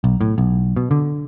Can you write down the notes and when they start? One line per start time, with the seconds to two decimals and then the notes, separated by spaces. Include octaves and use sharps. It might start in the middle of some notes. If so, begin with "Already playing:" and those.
0.04 B1
0.21 A2
0.38 B1
0.77 B2
0.91 D3